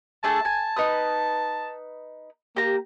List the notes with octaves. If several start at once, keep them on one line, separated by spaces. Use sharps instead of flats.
A3 D4 G#4 A5
G#5
D#4 B4 D#6
A#3 G4 A#5